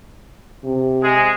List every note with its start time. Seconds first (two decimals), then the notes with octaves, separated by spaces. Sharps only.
0.64 C3
1.04 G#3 G#4